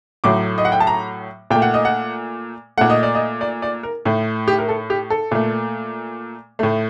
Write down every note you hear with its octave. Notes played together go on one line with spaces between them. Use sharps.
A2 F#3 A3 D6
D#5
F#5
G5
A5
A#5
A#2 A3 G5
F#5
D#5
F#5
A#2 A3 F#5
D#5
D5
D#5
D5
D5
A#4
A2 A3
G4
A#4
A4
G4
A4
A#2 A3
A2 A3